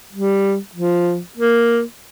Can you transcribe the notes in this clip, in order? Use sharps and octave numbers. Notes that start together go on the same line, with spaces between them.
G3
F3
A#3